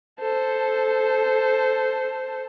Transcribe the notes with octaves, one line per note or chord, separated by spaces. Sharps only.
A4 C5